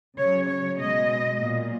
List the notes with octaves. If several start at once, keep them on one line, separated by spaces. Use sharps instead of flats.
C#3 F#3 C#5
C#5
B2 G#3 D#5
A#2 F#3